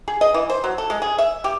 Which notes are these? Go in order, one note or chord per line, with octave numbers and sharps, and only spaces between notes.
G#4
D#5
E3
C5
F#3
A4
G#3
G#4
E5
G4